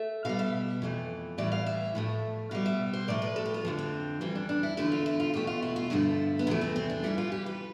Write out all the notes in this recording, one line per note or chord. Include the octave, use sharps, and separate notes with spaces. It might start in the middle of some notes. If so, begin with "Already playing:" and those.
Already playing: A3 E5
B2 G3 F5
E5
F2 E3 A3
A2 E3 G3 D5
F5
E5
A2 F3 A3
B2 G3 F5
E5
C5
A2 F3 A3 D5
B4
A4
G4
F4
F2 D3 F3
C4
F2 E3 G3 C4
D4
D4
E4
E2 D3 A3 E4
F4
E4
F4
E2 B2 A3 G4
F4
E4
F4
G2 D3 F3 A3 E4
B3
E2 C3 F3 A3 C4
C4
C4
D4
F2 E3 G3 E4
F4
G4
B4